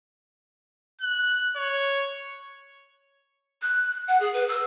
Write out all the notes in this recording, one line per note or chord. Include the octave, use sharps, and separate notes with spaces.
F#6
C#5
F#6
F#5
G#4
B4
E6